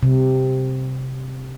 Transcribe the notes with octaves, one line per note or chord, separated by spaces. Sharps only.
C3